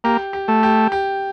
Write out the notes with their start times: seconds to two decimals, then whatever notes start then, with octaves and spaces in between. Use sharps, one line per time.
0.04 A#3 G4
0.33 G4
0.48 A3
0.63 G4
0.92 G4